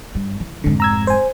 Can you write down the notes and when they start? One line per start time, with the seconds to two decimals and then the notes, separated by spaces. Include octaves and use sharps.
0.15 G2
0.40 E3
0.64 F1 G#2 D3
0.80 A#5 E6 G#6
1.07 C5 G#5